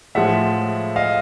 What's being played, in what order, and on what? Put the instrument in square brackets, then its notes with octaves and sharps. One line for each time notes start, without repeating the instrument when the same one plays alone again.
[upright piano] A2 F3 G#3 [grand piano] E5 F#5
[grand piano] D#5 F5